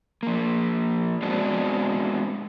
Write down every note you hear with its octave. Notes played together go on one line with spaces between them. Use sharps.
F3 A#3
G#3 B3 C4 D4 F#4